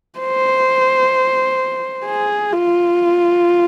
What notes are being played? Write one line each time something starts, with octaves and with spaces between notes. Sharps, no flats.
C5
G#4
F4